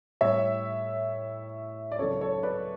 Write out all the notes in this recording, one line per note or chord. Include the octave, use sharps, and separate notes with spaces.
A2 G3 C#5 E5
D5
C#2 C#3 F#3 A4 C#5
A4 C#5
B4 D5